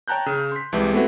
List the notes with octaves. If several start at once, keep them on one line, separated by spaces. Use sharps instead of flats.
C#5 G5 A5 A#5 F#6 G6
C#3
C6 B6
C2 E3 G#3 G4 A5
A3 B3 C4 E4 F#4